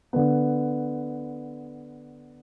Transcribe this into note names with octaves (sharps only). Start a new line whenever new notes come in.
D3 B3